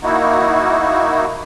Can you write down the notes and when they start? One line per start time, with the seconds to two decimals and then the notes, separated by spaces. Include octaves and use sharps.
0.03 A#3 D#4 E4 F#4